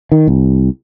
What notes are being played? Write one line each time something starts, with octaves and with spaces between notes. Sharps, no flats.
D#3
C2